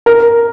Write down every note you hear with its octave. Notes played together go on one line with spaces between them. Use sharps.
A#4